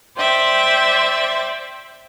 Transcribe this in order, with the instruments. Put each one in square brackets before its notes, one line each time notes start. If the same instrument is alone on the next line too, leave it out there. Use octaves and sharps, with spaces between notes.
[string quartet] C5 D5 E5 G5